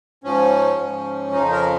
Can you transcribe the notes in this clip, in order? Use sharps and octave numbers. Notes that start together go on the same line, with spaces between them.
G#2 F3 C#4
G#2 F3
F2 C#3 F3 D#4
A#4